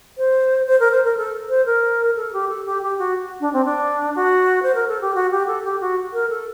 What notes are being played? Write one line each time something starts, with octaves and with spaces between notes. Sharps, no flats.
C5
C5
A#4
C5
A#4
A4
C5
A#4
A4
G4
A4
G4
G4
F#4
D4
C4
D4
F#4
C5
A#4
A4
G4
F#4
G4
A4
G4
F#4
A#4
A4